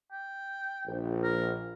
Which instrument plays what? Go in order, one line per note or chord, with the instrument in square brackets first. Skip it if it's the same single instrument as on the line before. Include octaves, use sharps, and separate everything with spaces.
[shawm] G5
[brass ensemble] A#1
[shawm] A#4